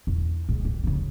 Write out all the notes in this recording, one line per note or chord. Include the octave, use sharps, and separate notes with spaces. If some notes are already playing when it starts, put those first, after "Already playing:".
E2
G#2
G3
D2 C#3